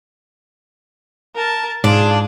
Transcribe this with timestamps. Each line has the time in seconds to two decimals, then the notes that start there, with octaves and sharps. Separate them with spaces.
1.35 A#4 A5
1.84 G#2 D4 F4 G#4